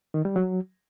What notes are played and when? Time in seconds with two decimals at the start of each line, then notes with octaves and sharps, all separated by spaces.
0.14 D#3
0.25 G3
0.36 F#3